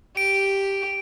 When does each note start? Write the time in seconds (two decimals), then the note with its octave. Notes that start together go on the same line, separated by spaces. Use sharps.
0.17 G4 D7